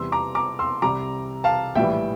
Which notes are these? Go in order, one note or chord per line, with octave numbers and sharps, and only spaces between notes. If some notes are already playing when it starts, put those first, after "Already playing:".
Already playing: E2 C3 E3 G3 C6 E6
A#5 D6
A#5 D6
C6 E6
C2 C3 G3 A#5 D6
F5 A5
A#1 A2 E3 G3 E5 G5